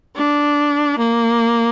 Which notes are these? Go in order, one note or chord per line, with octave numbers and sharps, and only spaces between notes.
D4
A#3